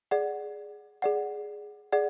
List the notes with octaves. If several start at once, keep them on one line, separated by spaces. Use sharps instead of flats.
G#4 D5 F#5
G#4 D5 F#5
G#4 D5 F#5